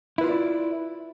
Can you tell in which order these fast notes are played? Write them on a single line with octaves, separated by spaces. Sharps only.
E4 B4 F4 C5 D5